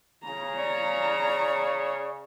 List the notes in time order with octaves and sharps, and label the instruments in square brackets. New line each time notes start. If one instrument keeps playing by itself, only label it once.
[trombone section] C#3 [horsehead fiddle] A#5
[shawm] C#5 [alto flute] D5